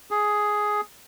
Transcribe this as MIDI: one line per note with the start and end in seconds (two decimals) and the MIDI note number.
0.11 0.81 68